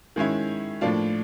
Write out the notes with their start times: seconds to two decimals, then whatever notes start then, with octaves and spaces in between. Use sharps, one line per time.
0.16 D#3 G#3 C#4 E4
0.81 A2 F3 A#3 D4 F4